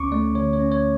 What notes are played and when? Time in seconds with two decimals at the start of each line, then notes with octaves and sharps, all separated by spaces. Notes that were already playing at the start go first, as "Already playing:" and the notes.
Already playing: D2 C#4 C#6 D6
0.12 A3 D5
0.35 D3 C#5
0.53 C#5
0.60 C#4
0.72 C#5